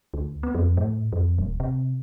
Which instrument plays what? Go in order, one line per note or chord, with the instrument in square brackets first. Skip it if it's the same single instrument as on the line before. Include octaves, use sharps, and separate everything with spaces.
[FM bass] D2
B3
F2
A2
F2
D#1
C3